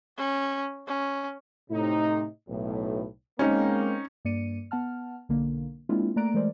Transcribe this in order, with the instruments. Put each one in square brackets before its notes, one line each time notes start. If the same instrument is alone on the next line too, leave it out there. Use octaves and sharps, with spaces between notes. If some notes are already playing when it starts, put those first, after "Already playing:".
[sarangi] C#4
C#4
[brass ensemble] A2 C3 D#4
B1 A2
[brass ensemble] G#3 A#3 C4 [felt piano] C#4 D#4
[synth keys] G2 A#3 D5 C#7 D#7
B3 F#5 A5 F6
B1 D3 A#3
G#3 A#3 C4 D4 E4 F4
A3 A#3 D5 A#5 F#6 D7
E3 G#3 A3 A#4 C5 D5